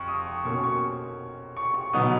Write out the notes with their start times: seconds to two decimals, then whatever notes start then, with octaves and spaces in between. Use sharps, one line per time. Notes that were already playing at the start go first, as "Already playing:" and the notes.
Already playing: F2 C#6
0.08 D#6
0.27 C#6
0.44 B2 A#3 C#4 C#6
0.64 C#6
1.57 C#6
1.74 C#6
1.93 B2 F#3 B3 D#4 D#6